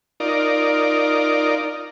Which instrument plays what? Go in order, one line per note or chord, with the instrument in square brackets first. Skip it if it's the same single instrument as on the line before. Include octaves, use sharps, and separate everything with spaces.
[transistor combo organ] D#4 F4 A#4 D5